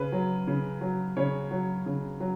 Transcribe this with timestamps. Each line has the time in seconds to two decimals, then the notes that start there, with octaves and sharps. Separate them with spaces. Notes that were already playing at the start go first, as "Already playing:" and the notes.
Already playing: C#3 B4
0.12 F#3
0.47 C#3
0.81 F#3
1.17 C#3 C#5
1.51 F#3
1.86 C#3
2.20 F#3